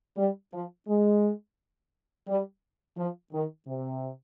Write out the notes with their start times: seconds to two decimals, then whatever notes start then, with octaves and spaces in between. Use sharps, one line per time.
0.17 G3
0.53 F3
0.88 G#3
2.27 G3
2.97 F3
3.32 D#3
3.67 C3